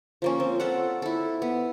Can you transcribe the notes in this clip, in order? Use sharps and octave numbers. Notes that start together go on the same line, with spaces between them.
F3 A#3 C#4
C4
F4 A4 D5 F#5
E4 A4
B3